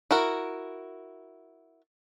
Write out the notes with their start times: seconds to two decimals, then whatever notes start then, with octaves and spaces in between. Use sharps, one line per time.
0.11 E4 F#4 A#4